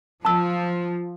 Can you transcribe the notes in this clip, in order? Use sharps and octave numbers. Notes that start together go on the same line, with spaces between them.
F3 A5 E6